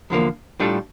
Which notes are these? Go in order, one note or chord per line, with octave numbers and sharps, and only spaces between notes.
E2 D3 F3 A#3
A2 G3 D4 F4 A4